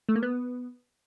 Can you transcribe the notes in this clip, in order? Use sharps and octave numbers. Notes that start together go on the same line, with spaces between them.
A3
A#3
B3